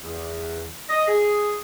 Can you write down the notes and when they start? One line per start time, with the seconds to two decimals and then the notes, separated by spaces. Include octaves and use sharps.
0.04 E2
0.89 D#5
1.08 G#4